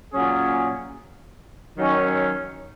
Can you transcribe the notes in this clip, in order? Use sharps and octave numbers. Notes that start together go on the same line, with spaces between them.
A#2 F#3 C#4 G#4
D#3 F#3 C#4